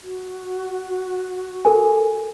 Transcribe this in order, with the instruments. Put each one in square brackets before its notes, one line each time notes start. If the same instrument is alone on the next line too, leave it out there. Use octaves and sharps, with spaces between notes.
[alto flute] F#4
[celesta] A4 A#4 G#5